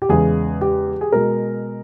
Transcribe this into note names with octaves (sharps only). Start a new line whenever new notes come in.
G4
E2 C#3 G#3 G#4
G4
G#4
B2 G#3 A#4